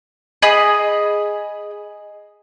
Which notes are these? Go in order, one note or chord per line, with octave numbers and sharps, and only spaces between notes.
G#4 D#5 B5 D#6